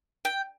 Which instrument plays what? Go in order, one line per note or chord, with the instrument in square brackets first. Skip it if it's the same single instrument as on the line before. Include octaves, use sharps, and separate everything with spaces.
[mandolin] G5